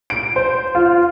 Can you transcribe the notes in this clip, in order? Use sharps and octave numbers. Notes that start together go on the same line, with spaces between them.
D7
C5
F4